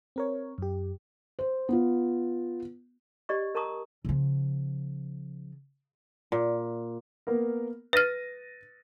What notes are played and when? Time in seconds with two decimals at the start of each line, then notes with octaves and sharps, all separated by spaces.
0.16 C4 A#4 C#5
0.58 F#2 G4
1.39 C5
1.69 B3 F4
3.29 G4 D5 D#5 C#6
3.55 A#4 A5 A#5 C#6 D#6
4.05 C#3 F3
6.32 A#2
7.27 A#3 B3 A#4
7.93 B4 F6 A6 A#6 D#7